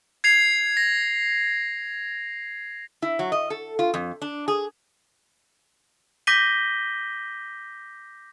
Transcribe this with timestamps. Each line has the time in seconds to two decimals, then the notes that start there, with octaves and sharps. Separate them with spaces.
0.24 G#6 C7 F7
0.77 A#6
3.02 E4
3.19 F#3
3.32 D#5
3.50 A4
3.79 F4
3.94 F2
4.22 D4
4.48 G#4
6.27 D6 G6 A#6 B6 D#7 G7